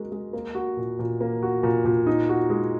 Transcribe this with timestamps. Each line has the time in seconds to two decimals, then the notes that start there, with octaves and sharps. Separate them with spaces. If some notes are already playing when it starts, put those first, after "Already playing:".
Already playing: G#3 F#4 A#4
0.12 G#3
0.33 A#3
0.55 F#4
0.77 A#2
0.99 A#2
1.21 A#3
1.43 F#4
1.63 A#2
1.85 A#2
2.07 D#4
2.29 F#4
2.50 G#3